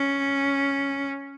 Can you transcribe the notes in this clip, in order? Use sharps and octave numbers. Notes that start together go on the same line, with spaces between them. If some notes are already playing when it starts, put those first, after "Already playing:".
Already playing: C#4